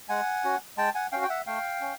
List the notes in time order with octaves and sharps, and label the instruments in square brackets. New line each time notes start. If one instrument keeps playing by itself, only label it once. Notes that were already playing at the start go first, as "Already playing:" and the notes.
[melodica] G#3 F#5 G#5
C#4 F#4
G#3 G5 A5
F#5 G#5
C#4 F#4 F5 G5
G5
E5 F#5
A3 F5 G5
C#4